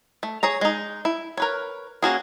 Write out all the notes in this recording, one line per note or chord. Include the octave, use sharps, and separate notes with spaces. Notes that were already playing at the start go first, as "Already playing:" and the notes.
A3
G#4 C#5 A#5
G#3 D#4
E4
A#4 B4 C#5
A#3 C#4 F#4 G#4